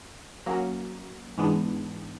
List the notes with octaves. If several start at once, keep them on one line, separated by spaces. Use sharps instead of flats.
F#3 A#3 C#4 F#4
G#2 E3 G#3 B3 D4